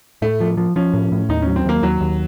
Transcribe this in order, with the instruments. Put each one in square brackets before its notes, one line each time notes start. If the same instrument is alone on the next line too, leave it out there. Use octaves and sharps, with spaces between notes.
[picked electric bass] A2 [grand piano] A3
[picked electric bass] F3
F3
[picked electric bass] F3 [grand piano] C#4
[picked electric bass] A2
A2
[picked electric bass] D#2 [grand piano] D#4
[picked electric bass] F#3 [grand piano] C#4
[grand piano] C4
[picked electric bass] D#2 [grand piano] A#3
[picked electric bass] D#2 [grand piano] F#3
[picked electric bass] D#2